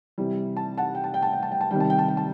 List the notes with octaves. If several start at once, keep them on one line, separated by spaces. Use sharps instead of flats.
C3 E3 G3
A5
F#5 A5
G5
A5
G5
A5
G5
A5
G5
A5
C3 D#3 G3 G5
A5
G5
A5
G5
A5